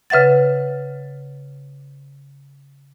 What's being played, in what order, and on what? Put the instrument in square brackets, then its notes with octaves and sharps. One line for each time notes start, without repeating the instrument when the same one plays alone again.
[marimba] C#3 B4 E5 F#5 A6